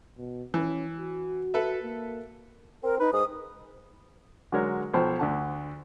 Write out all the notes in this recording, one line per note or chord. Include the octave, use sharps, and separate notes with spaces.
B2
E3 C#4
F#4
A4 B4 E5
A#3
C4 A#4
D#4 B4
G#2 D#6
D3 F#3 G#3 A#4 C#5
B1 F3 C5 G5 A5
D2 D3 A5